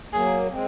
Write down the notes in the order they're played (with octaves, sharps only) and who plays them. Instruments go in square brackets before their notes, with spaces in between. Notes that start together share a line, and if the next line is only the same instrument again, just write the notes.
[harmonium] F#3 A#3 [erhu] G#4
[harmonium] G#3 C4